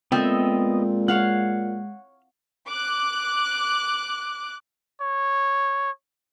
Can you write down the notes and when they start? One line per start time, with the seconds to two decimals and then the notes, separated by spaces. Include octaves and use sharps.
0.12 A#2 G#3 B3 C4 A4 D#5 E5
1.08 C#5 F5 F#5 F6
2.69 D6 F#6
5.01 C#5